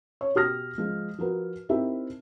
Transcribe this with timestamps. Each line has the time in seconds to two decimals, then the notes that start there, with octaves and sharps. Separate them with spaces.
0.21 C#5
0.35 B2 G4 D#6 F6 A#6
0.78 F3 G#3
1.18 F3 F#4 A#4 B4
1.69 C4 D#4 E4 G4 A#4 E5